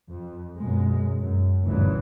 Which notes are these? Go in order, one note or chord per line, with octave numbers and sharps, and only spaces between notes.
F2
F#2 B2 G#3
F#2
F1 D2 G2 A#2 C#3 E3